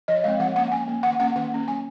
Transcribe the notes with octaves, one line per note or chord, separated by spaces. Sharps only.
F3 D#5
G#3 C4 F5
F3 F#5
A#3 C#4 F#5
F3 G#5
A#3 C#4
D#3 F#5
A#3 C#4 F#5
D#3 F#5
A#3 C#4
F#3 G#5